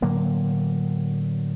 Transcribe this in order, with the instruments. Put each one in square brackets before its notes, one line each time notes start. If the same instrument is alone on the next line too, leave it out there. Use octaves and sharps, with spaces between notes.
[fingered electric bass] A2 D3 F#3 A#3